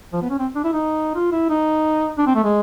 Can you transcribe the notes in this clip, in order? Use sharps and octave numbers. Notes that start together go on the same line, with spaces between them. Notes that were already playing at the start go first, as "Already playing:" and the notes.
F3
B3
C#4
C4
D4
E4
D#4
F4
E4
D#4
D4
C4
A3
G#3